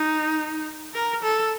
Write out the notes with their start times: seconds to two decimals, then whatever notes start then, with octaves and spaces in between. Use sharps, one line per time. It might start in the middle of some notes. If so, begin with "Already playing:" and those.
Already playing: D#4
0.94 A#4
1.23 A4